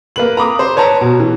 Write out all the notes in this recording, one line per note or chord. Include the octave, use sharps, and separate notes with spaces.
A#3 B4 F#7
A#5 B5 D6 D#6
C5
B4 C#5 A5 A#5
B2
E3